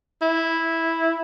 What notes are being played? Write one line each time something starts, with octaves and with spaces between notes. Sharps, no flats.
E4